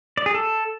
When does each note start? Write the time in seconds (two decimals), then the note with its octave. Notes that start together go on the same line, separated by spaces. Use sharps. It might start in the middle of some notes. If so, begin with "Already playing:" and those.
0.17 D5
0.26 G#4
0.35 A4